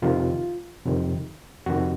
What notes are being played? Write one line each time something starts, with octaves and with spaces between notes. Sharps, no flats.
F2 C3 D#3 F4
F2 C3 D#3
F2 C3 D#3 F#4